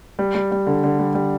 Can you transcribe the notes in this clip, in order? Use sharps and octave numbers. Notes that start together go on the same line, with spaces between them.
G3
G3
G3
D3
D3
G3
G3